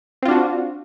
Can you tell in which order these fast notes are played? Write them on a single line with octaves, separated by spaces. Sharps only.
C4 F4 D4 F#4